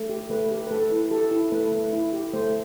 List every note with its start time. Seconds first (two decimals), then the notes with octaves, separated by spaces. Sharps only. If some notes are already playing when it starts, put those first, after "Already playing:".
Already playing: A3
0.10 G4
0.30 A3 B4
0.51 G4
0.67 B4
0.71 A3 A4
0.91 E4
1.11 G4 A4
1.31 E4
1.52 A3 B4
1.72 A3
1.93 E4
2.13 G4
2.33 A3 C5